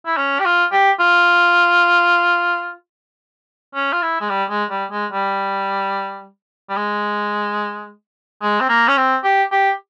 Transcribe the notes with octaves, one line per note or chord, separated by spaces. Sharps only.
E4
C#4
G4
F4
G4
F4
C#4
F4
E4
G#3
G3
G#3
G3
G#3
G3
G3
G#3
G#3
C4
A#3
C#4
C4
G4
G4